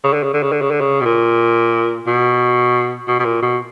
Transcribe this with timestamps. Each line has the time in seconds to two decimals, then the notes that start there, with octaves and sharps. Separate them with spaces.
0.04 C#3
0.13 D3
0.23 C#3
0.33 D3
0.43 C#3
0.52 D3
0.62 C#3
0.71 D3
0.81 C#3
1.01 B2
1.05 A#2
2.07 B2
3.08 B2
3.20 B2
3.25 A#2
3.42 B2